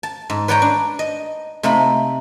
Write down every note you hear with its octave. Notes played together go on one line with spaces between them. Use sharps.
A5
G#2
B4 C#5 D5 G5 G#5 A#5
D4
D#5
C3 A3 D#4 F5 B5